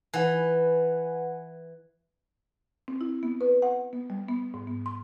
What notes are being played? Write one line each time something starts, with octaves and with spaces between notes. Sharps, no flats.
E3 B4 F#5 G#5
C4
E4
B3
B4
F#5
B3
G3
B3
G#2
B3
C6